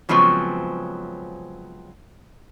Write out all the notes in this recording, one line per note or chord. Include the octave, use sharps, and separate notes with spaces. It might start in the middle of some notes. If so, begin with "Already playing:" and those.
C#3 F3 F#3 G#3 B3 C4